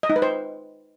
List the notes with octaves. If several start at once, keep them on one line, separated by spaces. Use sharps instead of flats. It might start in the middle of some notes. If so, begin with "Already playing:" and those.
D#5
D#4
B4
C5